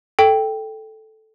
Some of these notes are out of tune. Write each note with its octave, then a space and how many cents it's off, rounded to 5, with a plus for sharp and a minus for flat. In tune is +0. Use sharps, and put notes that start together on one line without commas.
A4 -5 G5 +0